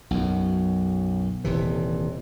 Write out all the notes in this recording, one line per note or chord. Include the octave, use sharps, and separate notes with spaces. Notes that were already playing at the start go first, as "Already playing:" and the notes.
B1 F#2
D#1 C3 E3